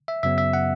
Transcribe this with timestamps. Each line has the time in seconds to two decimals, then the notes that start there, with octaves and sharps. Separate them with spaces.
0.08 E5
0.23 F#2 C#3 F#3 B3 E5
0.38 E5
0.53 F#5